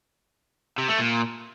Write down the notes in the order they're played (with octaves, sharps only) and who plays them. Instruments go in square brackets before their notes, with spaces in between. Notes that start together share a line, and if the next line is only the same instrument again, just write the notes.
[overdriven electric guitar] C3
A3
A#2